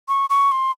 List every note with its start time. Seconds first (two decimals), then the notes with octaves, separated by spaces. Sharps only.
0.08 C#6
0.30 C#6
0.52 C6